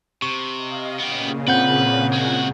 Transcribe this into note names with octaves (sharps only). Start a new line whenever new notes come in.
C3 C#6
D#5 F5
A#2 C#3 B3 G4
C4 B4 F#5 G6
G#3 F#4